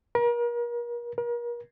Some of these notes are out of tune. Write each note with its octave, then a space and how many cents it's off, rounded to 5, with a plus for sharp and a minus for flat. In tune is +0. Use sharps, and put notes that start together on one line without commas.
A#4 +35
A#4 +35